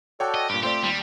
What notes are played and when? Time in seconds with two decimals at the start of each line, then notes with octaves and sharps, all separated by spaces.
0.20 F#4 A4 C#5 D5 G5 A5
0.34 D#5
0.49 G2 A#2 G4
0.63 A3 C4 F4 G4 C5 D5
0.83 D#2 G3